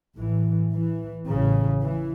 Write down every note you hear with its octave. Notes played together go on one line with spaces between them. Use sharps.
A1 A2 E3
E3
A1 A2 C#3
E3